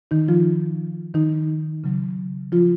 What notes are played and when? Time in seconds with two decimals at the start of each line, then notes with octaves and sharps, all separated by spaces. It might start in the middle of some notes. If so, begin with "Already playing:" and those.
0.11 D#3 D#4
0.28 F3 F4
1.14 D#3 D#4
1.84 C#3 F#3
2.52 F3 F4